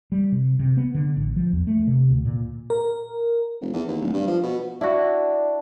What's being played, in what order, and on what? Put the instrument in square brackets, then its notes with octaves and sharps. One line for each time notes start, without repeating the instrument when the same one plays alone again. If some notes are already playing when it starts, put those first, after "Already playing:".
[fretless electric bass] G3
C3
C3
B3
D3
A1
F3
E2
A3
C3
D2
A#2
[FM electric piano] A#4
[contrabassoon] F1
E2
D#2
D1
G2
F3
B2
[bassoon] D4 [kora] E4 F#4